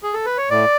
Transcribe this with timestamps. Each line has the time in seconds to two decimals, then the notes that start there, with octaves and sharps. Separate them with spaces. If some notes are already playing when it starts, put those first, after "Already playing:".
0.03 G#4
0.14 A4
0.26 B4
0.38 C#5
0.50 A2 D5